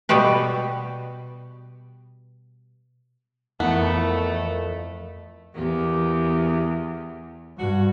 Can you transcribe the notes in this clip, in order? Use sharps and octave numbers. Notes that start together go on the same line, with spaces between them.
B2 G3 B3 F#4 G4 B4
F2 E3 A3 B3 A#4 C#7
E2 A#3 G4
G2 F#4